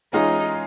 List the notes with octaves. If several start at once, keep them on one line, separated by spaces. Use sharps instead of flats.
E3 G#3 C#4 D#4 F4